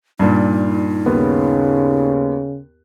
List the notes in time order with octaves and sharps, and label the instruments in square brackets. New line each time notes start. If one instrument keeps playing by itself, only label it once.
[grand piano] G2 A#2 [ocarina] D#4
[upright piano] D#2 B3 [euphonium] C#3